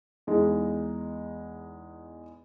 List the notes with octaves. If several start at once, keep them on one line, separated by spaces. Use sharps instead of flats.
E2 G#3 D#4